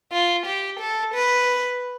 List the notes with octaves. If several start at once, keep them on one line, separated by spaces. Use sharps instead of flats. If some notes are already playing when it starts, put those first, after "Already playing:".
F4
G4
A4
B4